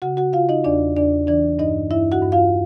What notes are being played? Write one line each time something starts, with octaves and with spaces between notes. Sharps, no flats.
C#3 F#4 F#5
F#4 F#5
C#3 F4 F5
D#4 D#5
E2 D4 D5
E2 D4 D5
E3 D4 D5
G2 D#4 D#5
G2 E4 E5
F#4 F#5
G2
F4 F5